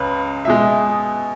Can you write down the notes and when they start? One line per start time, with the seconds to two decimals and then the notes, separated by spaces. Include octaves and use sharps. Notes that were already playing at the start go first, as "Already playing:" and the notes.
Already playing: C#2 C#3 B4
0.45 B2 G#3 E5